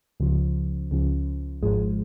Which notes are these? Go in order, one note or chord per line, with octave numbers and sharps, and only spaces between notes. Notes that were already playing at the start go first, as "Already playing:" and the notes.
C#2 C#3 F3
C#2 C#3 F3
G#1 G#2 F3 G#3